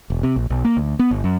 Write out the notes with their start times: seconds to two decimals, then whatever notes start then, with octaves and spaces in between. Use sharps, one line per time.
0.10 E1
0.23 C3
0.36 A#1
0.50 B1
0.65 A#3
0.77 D2
0.99 B3
1.11 G1
1.24 F#2